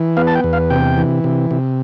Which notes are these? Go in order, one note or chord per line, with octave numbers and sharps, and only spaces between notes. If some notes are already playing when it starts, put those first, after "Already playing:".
Already playing: E3
B3 F5
A5
G5
E2
F5
C3 G5
E3
C3
C3